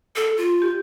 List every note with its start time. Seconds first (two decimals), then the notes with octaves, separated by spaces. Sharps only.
0.16 A4
0.37 F4
0.62 G4